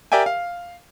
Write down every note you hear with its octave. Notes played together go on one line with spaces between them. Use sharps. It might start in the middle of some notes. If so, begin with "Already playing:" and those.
G4 A#4 D5 E5 G5 G#5
F5